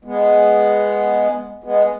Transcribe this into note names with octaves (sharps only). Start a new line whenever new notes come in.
G#3 B3
G#3 B3